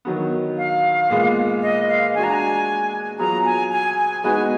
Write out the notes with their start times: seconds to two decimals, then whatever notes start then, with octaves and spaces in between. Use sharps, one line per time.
0.05 D#3 F#3 B3
0.57 F5
1.10 A#2 G#3 B3 F4 B4
1.62 D#5
1.88 F5
2.15 G#3 D4 F#4 G#5
2.23 A#5
2.33 G#5
3.19 F#3 B3 F4 G#4 A#5
3.45 G#5
3.72 G#5
3.98 G#5
4.24 G#3 B3 D#4 F#4 B4 G#5